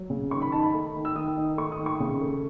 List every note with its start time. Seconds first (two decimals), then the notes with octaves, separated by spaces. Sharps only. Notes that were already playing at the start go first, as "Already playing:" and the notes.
Already playing: F#3
0.10 C#3
0.31 D#3 C#6
0.42 B5
0.52 D#4 A5
0.63 B5
0.74 A3
0.95 D#3
1.05 E6
1.15 D#3 D#6
1.37 D#4
1.57 A3 C#6
1.72 D#6
1.79 D#3
1.86 C#6
2.00 C#3
2.21 A3